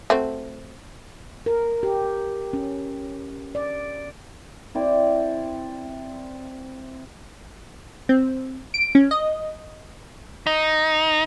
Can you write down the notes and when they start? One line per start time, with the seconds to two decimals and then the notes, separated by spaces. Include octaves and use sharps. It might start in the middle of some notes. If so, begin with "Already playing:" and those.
0.10 A3 C4 F#4
1.46 A#4
1.83 G4
2.53 C#4
3.55 D5
4.75 C4 E4 D5
8.09 C4
8.74 D7
8.95 C#4
9.11 D#5
10.47 D#4